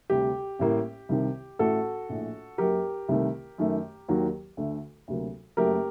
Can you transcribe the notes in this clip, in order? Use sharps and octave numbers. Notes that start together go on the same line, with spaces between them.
D2 C3 G3 G4
A1 A2 G3 A#3
C2 C3 D#3
A1 A2 A3 F#4 A4
A#1 A2 A3
F#2 F#3 A#3 G4 A#4
C2 C3 D#3 A3
F#2 D#3 A3
D#2 D#3 F#3 A#3
D2 D3 A3
D2 C3 F#3 A#3
F#1 F#2 F#3 A3 G4 A#4